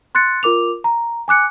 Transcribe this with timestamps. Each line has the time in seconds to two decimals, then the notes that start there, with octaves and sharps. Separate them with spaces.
0.15 C6 F#6 A6 C#7
0.43 F4 A#4 D6 F7
0.84 A#5
1.28 G#5 D6 F#6 C#7